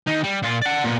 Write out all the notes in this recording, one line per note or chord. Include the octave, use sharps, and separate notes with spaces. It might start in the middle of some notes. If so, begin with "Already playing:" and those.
D#2 D#4
G3
A#2 F4
D5 F#5
A#2 B3